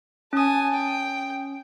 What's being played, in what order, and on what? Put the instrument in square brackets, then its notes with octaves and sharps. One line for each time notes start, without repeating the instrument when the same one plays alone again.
[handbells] C#4 D#6 [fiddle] G#5 A5
[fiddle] G5